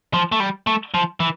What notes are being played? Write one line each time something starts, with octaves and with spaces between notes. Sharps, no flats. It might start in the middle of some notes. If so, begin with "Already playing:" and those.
F3
A3
G3
A3
F3
E3